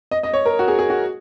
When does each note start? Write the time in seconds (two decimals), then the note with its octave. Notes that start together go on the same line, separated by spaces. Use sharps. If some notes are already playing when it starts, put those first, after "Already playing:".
0.11 D#5
0.23 D#5
0.33 C#5
0.46 A#4
0.59 F#4
0.68 G#4
0.79 G#4
0.90 F#4